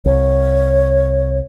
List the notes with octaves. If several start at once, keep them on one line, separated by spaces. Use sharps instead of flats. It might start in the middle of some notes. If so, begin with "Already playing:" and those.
C2 C#5